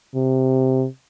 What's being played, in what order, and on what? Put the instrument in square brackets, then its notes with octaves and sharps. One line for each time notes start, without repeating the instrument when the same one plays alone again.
[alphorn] C3